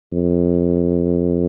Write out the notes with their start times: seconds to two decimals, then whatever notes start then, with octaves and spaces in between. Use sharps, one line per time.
0.12 F2